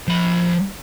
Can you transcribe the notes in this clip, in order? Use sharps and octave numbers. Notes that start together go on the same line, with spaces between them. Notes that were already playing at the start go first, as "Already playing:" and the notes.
F3 B5